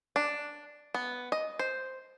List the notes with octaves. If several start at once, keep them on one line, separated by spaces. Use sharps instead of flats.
D4
B3
D#5
C5